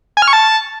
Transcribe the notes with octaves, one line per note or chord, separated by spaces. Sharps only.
G#5
F6
C#6
A5